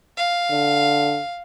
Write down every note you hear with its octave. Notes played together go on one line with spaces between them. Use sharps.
F5
D3